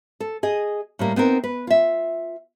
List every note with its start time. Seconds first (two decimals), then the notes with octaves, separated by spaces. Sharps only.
0.20 A4
0.43 G#4 D#5
0.99 A2 G3 A#3
1.16 B3 C4 D#4 A#4
1.44 B4
1.67 F4 E5